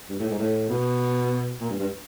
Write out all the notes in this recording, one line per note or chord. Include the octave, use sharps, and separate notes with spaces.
G2
A2
G#2
A2
B2
A#2
G2
G2